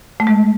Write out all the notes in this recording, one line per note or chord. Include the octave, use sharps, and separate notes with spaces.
A3
G#3